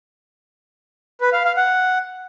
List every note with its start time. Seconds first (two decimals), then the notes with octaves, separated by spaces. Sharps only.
1.21 B4
1.33 F5
1.45 F5
1.57 F#5